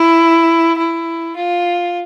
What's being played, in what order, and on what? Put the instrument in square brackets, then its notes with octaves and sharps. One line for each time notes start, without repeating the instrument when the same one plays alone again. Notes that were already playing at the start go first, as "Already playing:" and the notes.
Already playing: [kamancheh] E4
E4
F4